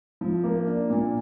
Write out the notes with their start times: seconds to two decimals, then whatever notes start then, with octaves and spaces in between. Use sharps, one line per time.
0.21 F3
0.44 A#3
0.67 D4
0.90 A#2